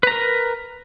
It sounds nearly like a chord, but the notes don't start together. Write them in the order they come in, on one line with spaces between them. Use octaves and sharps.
B4 A#5 A#4